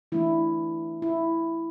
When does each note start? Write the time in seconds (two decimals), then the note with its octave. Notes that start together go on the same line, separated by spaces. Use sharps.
0.12 E3 A3 D4 E4
1.02 E4